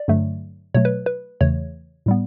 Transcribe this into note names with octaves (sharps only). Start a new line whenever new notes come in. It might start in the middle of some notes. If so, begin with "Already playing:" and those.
Already playing: D5
G2 D3 F#3 A3
B2 F#3 A3 C#5
B4
B4
E2 C#3 E3 A3 C#5
A2 G3 B3